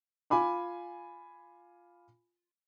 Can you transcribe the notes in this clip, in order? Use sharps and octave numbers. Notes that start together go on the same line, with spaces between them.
F4 G#5 B5 D6